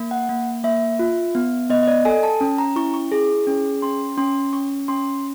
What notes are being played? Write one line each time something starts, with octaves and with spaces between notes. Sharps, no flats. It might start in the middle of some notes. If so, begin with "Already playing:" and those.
Already playing: A#3
F#5
A#3
A#3 E5
F4
B3
B3 D#5
D#5
D5
A4 G#5
A5
C#4
A#5
E4 C#6
C#6
G#4
C#4
C#4 C6
C#4 C6
C#4 C#6
C#4 C6